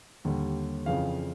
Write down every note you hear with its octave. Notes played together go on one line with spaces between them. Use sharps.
D#2 D3 G3
F2 C#3 E3 F5